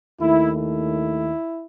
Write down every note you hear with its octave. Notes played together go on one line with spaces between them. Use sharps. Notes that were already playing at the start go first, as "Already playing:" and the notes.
D#2 D#3 A3 E4
E4